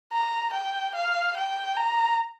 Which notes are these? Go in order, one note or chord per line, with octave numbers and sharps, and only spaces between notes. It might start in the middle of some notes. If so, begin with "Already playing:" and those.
A#5
G5
F5
G5
A#5